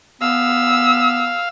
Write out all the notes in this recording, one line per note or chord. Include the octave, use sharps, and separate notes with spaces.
B3 F5 E6